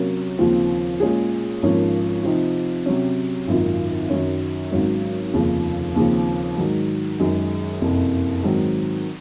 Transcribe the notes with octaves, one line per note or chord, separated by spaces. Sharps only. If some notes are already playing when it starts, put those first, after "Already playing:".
Already playing: C3 F#3 A#3 C#4
D#2 C#3 F3 C4 F4
A#2 G#3 C#4 F4 G#4
G#1 G#2 F3 A#3 C#4
C3 F3 C4 D#4
C3 F#3 C#4
G#1 F#2 D#3 A#3 F4
F#2 D#3 F#3 C#4
G#1 G#2 F#3 C#4
F1 D#2 C#3 F3
D#2 C#3 F3 C4
G#2 D#3 F#3
F#2 D#3 G#3 D#4 G#4
F#1 F2 C3
G#2 D#3 F#3 C4